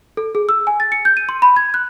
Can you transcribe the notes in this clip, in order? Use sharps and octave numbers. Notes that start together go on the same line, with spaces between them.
A4
G#4
E6
G#5
A6
C#7
G6
D#7
C6
B5
G#6
F#6